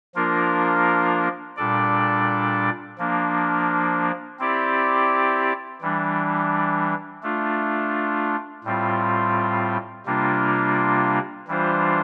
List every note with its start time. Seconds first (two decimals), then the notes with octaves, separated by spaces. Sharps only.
0.15 F3 A#3 D4 F4 A#4
1.56 A#2 G3 D4 A4 D5
2.98 F3 A#3 D4
4.40 C4 E4 G4 D5
5.81 E3 G3 D4
7.23 A3 D4 F4
8.64 A2 G3 C4 F4
10.06 C3 G3 A#3 D4 F4
11.48 E3 G3 D4 F4 C5